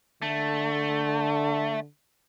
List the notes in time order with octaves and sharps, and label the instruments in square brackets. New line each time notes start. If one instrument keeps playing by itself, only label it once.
[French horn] D3 [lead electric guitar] A3